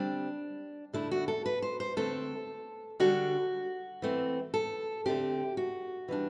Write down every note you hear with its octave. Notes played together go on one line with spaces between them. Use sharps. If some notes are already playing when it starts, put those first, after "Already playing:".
Already playing: D3 G3 C4 D4
D3 A3 D4 E4
F#4
A4
B4
C5
C5
D3 A3 C4 A4
D3 G3 D4 F#4
E3 A3 C4
A4
D3 A3 C4 G4
F#4
E3 G3 D4